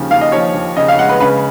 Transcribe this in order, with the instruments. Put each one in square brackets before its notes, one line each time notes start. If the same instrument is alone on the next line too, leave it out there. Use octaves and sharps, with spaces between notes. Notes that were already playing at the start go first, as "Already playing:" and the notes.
Already playing: [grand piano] D#2 C#3 F3
D#2 F5
D#5
F3 C#5
D#2
C#3 D#5
F5
G#3 F#5
B4
C#3 B4